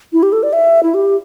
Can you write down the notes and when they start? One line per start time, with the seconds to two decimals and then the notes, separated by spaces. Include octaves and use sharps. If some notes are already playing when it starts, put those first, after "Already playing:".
0.13 E4
0.23 G4
0.32 A4
0.43 D5
0.53 E5
0.83 E4
0.94 G4